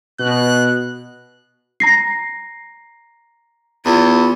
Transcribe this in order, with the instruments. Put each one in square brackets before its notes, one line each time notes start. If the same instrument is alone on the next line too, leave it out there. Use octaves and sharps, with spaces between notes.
[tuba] B2 [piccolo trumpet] F#6
[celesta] A#5 A#6 C7
[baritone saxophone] E2 [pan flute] F4